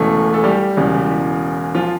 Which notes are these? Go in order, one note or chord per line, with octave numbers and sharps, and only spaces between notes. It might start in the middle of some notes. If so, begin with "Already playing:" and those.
Already playing: E1 E2 C#3 E3 A3 A4
A4
G3 G4
E1 E2 C#3
F3 F4